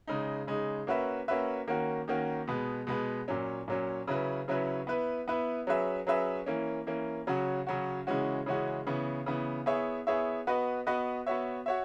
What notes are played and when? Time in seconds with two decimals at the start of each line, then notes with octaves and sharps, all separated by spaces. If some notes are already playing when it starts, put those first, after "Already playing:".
0.07 C#3 G#3 D#4
0.47 C#3 G#3 D#4
0.87 A#3 C#4 F#4 B4 E5
1.28 A#3 C#4 F#4 B4 E5
1.67 D#3 A#3 C#4 F#4
2.08 D#3 A#3 C#4 F#4
2.48 B2 G#3 B3
2.87 B2 G#3 B3
3.28 A#2 F#3 C#4
3.68 A#2 F#3 C#4
4.07 C#3 F#3 C#4 E4 B4
4.48 C#3 F#3 C#4 E4 B4
4.87 B3 E4 B4
5.28 B3 E4 B4
5.67 F#3 C#4 G#4 B4 E5
6.07 F#3 C#4 G#4 B4 E5
6.46 E3 A#3 C#4
6.87 E3 A#3 C#4
7.27 C#3 F#3 C#4 F#4
7.67 C#3 F#3 C#4 F#4
8.07 C#3 E3 G#3 C#4 F#4
8.46 C#3 E3 G#3 C#4 F#4
8.87 C#3 E3 B3
9.26 C#3 E3 B3
9.66 B3 E4 G#4 C#5 E5
10.07 B3 E4 G#4 C#5 E5
10.47 B3 F#4 B4 D#5
10.87 B3 F#4 B4 D#5
11.26 B3 F#4 C#5 E5
11.66 F#4 C#5 E5